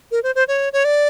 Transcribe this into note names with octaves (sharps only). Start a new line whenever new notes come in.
A#4
C5
C5
C#5
C#5
D5